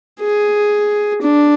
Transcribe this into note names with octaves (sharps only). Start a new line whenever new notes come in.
G#4
D4